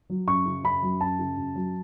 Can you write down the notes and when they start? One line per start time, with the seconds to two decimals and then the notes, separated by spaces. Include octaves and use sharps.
0.10 F#3
0.27 F#2 C#6
0.46 C#3
0.63 F#2 B5
0.83 F#3
1.01 F#2 A5
1.19 C#3
1.37 F#2
1.55 F#3